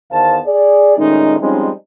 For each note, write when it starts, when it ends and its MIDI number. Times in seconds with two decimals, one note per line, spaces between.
0.12 0.39 40
0.12 0.39 51
0.12 0.39 59
0.12 0.39 72
0.12 0.39 77
0.12 0.39 81
0.46 0.97 68
0.46 0.97 74
0.97 1.36 46
0.97 1.36 51
0.97 1.36 56
0.97 1.36 57
0.97 1.36 61
0.97 1.36 63
1.40 1.69 53
1.40 1.69 55
1.40 1.69 56
1.40 1.69 60
1.40 1.69 61
1.40 1.69 63